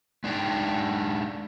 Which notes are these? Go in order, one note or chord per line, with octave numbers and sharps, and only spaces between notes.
G#3 D4 D#4 D5 G5